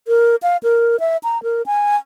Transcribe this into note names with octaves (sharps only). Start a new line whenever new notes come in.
A#4
F5
A#4
E5
A#5
A#4
G#5